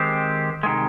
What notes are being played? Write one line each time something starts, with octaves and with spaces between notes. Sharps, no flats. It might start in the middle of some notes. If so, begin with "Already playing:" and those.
Already playing: D#3 G#3 C4 G4 C5
C3 D#3 G#3